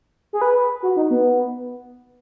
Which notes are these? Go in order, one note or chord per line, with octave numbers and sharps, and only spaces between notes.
G#4
B4
F#4
D#4
B3